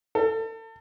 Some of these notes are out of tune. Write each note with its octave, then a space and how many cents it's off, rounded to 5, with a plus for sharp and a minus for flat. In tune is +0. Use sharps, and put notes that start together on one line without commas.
A4 +35